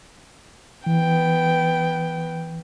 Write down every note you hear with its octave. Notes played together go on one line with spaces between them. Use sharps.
E3 B3 G5